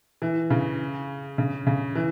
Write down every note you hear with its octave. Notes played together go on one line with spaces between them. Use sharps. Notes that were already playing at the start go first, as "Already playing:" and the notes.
E3
C#3
C#3
C#3
E3